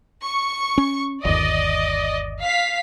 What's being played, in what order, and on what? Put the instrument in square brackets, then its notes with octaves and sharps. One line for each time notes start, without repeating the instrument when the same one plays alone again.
[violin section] C#6
[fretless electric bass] C#4
[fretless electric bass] G1 D#2 [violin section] D5 D#5
[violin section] F5 B6